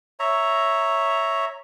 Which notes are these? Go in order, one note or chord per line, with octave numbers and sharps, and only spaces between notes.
C#5 E5 A#5